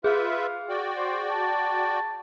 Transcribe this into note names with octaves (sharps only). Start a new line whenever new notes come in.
F4 G#4 B4 E5 F5
F#4 D5 G5
C5
A5